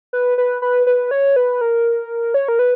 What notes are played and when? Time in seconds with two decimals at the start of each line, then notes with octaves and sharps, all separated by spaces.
0.13 B4
0.38 B4
0.62 B4
0.87 B4
1.11 C#5
1.36 B4
1.61 A#4
2.34 C#5
2.48 A#4
2.59 B4